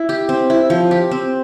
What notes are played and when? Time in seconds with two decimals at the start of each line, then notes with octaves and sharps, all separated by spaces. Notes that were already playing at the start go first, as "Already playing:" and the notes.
Already playing: E4
0.09 G4
0.29 C4
0.50 E4
0.70 F3
0.91 G4
1.11 C4